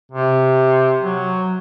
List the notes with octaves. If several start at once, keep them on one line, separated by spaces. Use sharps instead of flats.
C3
F#3